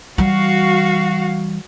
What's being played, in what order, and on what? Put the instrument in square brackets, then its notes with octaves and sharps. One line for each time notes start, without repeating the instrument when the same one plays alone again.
[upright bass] E3 G3 [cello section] F#4 F5